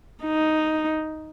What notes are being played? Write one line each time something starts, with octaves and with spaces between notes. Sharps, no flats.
D#4